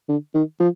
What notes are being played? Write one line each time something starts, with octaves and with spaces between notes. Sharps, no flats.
D3
D#3
F3